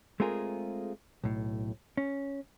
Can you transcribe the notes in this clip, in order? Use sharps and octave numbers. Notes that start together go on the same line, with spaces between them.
G#3 A3 C4 F4 G#4 A#4
B1 A2
C#4